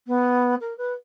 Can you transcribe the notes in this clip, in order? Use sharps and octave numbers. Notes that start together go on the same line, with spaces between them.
B3
A#4
B4